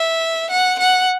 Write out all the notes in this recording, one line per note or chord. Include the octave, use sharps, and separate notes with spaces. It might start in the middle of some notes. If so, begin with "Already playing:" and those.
Already playing: E5
F#5
F#5